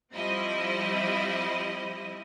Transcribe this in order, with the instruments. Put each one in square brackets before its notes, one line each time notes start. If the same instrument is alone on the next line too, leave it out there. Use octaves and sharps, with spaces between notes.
[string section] F3 G3 C4 E4 D#5